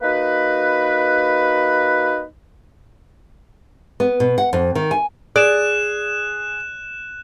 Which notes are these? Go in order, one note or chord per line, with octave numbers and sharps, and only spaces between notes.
A#3 D#4 F#4 B4
B3
B2
F#5
F2
D#3
G#5
G#4 D5 F#6 E7